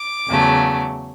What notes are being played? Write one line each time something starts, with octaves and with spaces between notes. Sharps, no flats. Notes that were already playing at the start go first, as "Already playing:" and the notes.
Already playing: D6
E2 C#3 F#3 A3